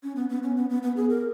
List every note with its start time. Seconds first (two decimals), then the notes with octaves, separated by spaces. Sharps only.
0.03 C#4
0.16 B3
0.29 B3
0.43 C#4
0.56 B3
0.69 B3
0.83 B3
0.96 G#4
1.09 A#4